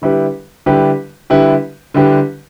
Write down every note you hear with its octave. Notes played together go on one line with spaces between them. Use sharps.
D3 G3 E4 G4 B4
D3 G3 E4 G4 B4
D3 G3 E4 G4 B4
D3 G3 E4 G4 B4